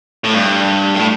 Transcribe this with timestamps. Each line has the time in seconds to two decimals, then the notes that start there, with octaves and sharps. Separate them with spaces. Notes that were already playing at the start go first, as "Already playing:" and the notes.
0.24 A2
0.34 G2
0.95 A2